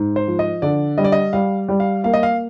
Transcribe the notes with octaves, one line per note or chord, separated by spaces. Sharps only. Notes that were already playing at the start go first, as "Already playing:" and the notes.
Already playing: G#2
C5
F3
D#5
D3 D5
G3 D#5
D5
D#5
G3 F5
G3
F5
A#3 F5
D#5
F5